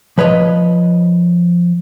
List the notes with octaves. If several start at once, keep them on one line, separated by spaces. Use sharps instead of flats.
F3 B4 C#5 D#5